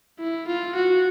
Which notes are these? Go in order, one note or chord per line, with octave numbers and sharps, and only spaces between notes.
E4
F4
F#4